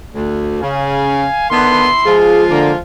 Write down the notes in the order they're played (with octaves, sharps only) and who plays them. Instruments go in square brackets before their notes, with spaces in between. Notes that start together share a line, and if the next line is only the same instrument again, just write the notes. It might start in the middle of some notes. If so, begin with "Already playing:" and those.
[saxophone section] D2
[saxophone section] C#3 [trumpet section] F5 G#5
[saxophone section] D3 D#3 B3 [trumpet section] E4 C6
[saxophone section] F3 G#3 F4 [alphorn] G#4
[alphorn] D3 [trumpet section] A#3